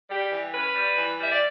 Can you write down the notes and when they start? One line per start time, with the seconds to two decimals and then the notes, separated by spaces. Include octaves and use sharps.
0.09 G3 G4
0.30 E3
0.53 C#4 B4
0.75 G3
0.96 E3
1.18 G3 E5
1.30 D5